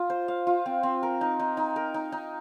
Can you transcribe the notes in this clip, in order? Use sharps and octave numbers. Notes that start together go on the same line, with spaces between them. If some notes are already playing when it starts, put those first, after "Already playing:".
Already playing: F4
C5
F5
F4
C4
C4
A#4
D#4
D#4
D#4
A#4
D#4
D#4